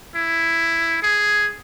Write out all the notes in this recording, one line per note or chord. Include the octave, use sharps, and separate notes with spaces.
E4
G#4